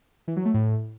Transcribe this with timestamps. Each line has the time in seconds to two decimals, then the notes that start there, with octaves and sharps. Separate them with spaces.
0.28 E3
0.36 F#3
0.45 A3
0.54 A2